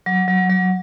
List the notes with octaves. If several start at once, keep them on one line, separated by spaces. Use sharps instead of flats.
F#3
F#3
F#3